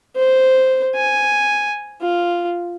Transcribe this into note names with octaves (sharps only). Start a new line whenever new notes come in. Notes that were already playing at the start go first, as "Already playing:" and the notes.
C5
G#5
F4